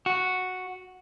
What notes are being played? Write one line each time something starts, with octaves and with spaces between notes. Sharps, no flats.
F#4